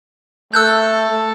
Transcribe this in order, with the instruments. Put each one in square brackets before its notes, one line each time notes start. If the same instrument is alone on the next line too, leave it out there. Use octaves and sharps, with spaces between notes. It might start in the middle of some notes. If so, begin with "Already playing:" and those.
[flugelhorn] A3 [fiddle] A4 [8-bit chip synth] E6 F#6 G6